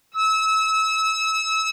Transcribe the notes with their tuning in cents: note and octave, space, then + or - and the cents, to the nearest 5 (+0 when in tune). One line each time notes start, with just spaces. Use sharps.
E6 -30